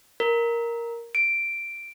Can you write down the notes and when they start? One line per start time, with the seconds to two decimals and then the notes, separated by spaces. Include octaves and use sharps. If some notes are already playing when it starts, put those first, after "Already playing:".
0.20 A#4
1.15 D7